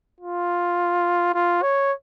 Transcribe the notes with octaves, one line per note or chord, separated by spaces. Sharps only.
F4
F4
C#5